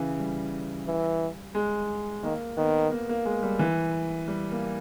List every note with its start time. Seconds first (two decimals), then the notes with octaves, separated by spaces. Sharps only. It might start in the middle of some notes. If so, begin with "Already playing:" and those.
Already playing: C#3 E3
0.19 G3
0.87 E3
1.55 G#3
2.23 D#3 A#3
2.57 D#3 B3
2.92 A#3
3.09 A#3
3.25 G#3
3.43 G3
3.59 E3
4.28 G3
4.52 A#3